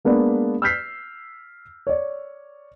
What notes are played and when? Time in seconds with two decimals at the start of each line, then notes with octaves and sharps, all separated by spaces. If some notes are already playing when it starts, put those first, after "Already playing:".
0.05 G#3 A#3 B3 D4
0.62 E6 F6 G6 B6 C7
1.87 C#5 D5